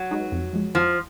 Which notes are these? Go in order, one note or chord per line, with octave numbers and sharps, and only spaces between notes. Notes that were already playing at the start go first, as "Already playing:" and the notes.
Already playing: F#3
G#3 D#4 F#4 B4
F2
F3 G#3
F2 F3